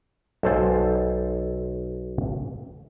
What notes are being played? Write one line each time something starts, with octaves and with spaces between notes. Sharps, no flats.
B1 A4 C5 G#5